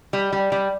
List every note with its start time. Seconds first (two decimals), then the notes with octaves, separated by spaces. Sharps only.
0.13 G3
0.33 G3
0.52 G3